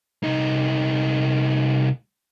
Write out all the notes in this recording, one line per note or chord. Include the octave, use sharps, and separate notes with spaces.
C2 D#4